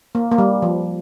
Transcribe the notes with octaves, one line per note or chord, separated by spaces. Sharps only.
A#3
A#3
G3
F3